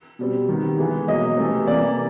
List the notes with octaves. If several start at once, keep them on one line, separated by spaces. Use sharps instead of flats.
B2 G3 C4
D#3 G3 B3
E3 G#3 B3
B2 F#3 A#3 D#5
C3 E3 A3 C4
C3 E3 G3 A#3 D5